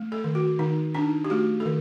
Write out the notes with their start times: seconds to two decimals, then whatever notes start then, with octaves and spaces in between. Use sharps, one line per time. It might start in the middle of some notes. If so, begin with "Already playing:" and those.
Already playing: A3
0.12 A4
0.24 D#3
0.35 F#4
0.59 D#3 D#4
0.94 D4 D#4
1.25 G4
1.30 A3 F#4
1.60 A4
1.66 D#3